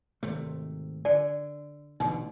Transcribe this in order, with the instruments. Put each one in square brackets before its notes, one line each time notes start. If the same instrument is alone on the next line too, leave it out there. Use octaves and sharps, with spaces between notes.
[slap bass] G#1 C3 A3
[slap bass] D3 [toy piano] D5
[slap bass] A1 B2 D3 [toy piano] D#4